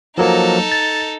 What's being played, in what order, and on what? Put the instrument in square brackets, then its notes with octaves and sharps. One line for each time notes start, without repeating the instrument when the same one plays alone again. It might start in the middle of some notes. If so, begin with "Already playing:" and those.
[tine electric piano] F3 F#3 A#3 [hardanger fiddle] D#4 A4
[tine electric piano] A6